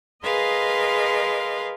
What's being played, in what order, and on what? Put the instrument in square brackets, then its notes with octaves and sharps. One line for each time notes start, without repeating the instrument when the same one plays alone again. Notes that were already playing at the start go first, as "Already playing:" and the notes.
[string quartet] G#4 A#4 B4 D#5 F5 C6